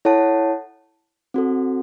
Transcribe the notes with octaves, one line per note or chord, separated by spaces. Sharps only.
E4 A4 C#5 F#5 A5
C4 F#4 A4